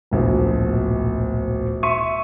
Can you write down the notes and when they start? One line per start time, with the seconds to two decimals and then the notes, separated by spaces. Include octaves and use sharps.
0.11 D1 A#1 B2
1.83 E5 C6 C#6 D#7